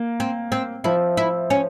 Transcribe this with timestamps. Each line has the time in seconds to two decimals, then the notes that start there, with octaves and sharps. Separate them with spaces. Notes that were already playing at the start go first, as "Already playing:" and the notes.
Already playing: A#3
0.20 C4
0.52 C4
0.84 F3 E4
1.17 E4
1.50 C#4